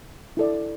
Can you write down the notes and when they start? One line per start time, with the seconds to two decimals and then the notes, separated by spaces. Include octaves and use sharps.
0.37 E4 A4 D5